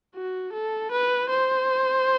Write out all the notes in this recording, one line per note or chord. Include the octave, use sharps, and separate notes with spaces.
F#4
A4
B4
C5